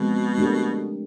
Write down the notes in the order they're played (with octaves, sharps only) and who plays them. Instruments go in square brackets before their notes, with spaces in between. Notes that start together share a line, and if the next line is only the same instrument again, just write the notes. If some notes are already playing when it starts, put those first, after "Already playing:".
Already playing: [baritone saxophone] B2 [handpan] F3 G#3 C4
[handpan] A3 D4 G4 A#4